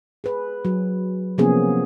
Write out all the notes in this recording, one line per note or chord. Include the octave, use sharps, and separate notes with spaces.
G#4 B4
F#3
C3 F3 A#3 B3 C#4 G#4